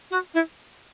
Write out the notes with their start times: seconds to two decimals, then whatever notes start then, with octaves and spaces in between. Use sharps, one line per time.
0.10 F#4
0.34 E4